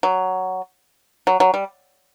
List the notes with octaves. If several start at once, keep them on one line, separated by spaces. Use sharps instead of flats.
F#3
F#3
F#3
G3